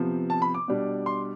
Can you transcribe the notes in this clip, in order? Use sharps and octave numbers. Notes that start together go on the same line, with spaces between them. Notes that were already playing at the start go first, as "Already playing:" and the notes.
Already playing: C3 F3 B3
A5
B5
D6
B2 G3 D4
C6